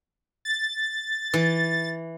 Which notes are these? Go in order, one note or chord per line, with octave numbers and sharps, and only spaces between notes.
A6
E3